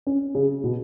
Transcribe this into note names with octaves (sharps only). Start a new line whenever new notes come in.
C#4
C#3
B2